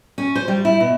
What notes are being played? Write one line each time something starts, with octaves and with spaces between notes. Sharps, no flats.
C#4
C5
G3
E4
B2